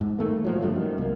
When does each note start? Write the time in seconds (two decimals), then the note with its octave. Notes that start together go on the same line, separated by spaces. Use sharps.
0.01 G#2
0.19 D#3 A3 A#3
0.44 A#2 F3 F#3
0.61 G1 G2 F3 A3
0.73 F#2 D#3
0.98 C2 A#3